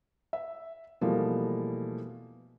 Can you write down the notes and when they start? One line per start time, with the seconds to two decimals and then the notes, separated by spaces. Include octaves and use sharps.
0.33 E5
1.01 B2 E3 F3 G3 A3 A#3